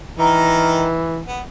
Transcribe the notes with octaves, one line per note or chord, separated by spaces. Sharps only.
D#3 E3 D#4 A#4
B3